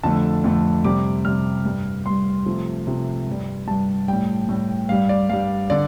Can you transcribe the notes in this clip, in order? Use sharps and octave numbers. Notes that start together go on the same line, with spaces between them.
F2 D3 A3 A5
F2 D3 A3
C3 G3 D6
C3 G3 F6
G2 G3
G2 G3 C6
C3 F3 A3
C3 F3 A3
G2 G3
G2 G3 A5
A2 G3 G5
A2 G3
G2 G3 F5
D5
G2 G3 F5
D3 D5